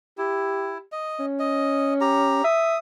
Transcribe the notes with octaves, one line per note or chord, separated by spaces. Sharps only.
E4 G4
D#5
C#4
D#5
G4 A#5
E5 D#6